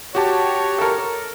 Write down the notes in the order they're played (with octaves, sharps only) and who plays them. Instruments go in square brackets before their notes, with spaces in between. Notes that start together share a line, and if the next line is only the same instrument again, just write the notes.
[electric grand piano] F#4 G4 A5 [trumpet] C#5
[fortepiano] A4 A#4